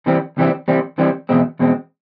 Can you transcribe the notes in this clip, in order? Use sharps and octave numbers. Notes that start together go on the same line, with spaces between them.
C2 C3 E3 G3 C4
C2 C3 E3 G3 C4
C2 C3 E3 G3 C4
C2 C3 E3 G3 C4
E2 B2 G#3 C4
E2 B2 G#3 C4